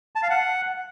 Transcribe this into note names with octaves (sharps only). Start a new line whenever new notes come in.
A5
F5
F#5